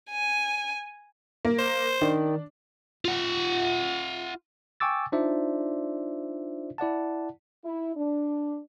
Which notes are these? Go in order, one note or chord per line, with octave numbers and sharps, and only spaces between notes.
G#5
A#3
C5
D#3 D4
F4 F#5
G5 G#5 C#6 D6 E6 A6
D4 D#4 F4 C5 D5 E5
E4 D5 F#5 A5
E4
D4